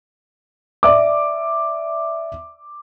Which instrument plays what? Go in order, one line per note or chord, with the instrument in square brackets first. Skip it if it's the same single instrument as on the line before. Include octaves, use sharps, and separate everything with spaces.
[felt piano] D5 E5 D6